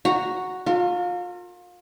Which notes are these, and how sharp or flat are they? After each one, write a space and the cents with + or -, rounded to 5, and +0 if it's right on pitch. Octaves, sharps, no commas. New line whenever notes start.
F#4 -5 A#5 +0
F4 +30 A#4 -35